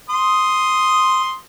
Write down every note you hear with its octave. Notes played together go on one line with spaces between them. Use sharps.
C6 D#6